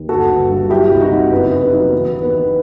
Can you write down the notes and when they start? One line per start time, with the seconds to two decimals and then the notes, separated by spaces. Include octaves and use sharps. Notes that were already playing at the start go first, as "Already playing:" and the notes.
Already playing: D#2
0.09 G1 F#4 A4
0.29 G1
0.50 G2
0.70 F#3 E4 G4
0.91 C2
1.01 D#4 F#4
1.10 C3
1.31 F#1 B3 D#4
1.52 F#3
1.62 B3 D#4
1.72 F#3
1.92 E2 B3
2.12 D#3
2.23 B3
2.33 D#3